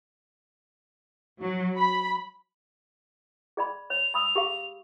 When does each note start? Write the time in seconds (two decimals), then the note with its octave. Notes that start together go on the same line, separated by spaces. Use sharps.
1.40 F#3
1.77 B5
3.57 G#4 D5 B5
3.90 C#5 F7
4.14 B5 D#6 E6
4.35 G4 G#4 F5